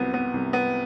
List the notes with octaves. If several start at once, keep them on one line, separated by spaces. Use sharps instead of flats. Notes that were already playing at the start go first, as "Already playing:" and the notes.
Already playing: C2 C3 F#3 B3
B3
C2
B3